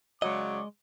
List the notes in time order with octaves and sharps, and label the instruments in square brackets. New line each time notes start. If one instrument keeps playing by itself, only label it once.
[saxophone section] C#3 F#3 [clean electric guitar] G#3 D#5 [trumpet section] D5 C#6 D6